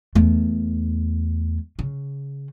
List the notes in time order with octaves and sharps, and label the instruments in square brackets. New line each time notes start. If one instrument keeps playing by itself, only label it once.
[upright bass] E2 A3
C#3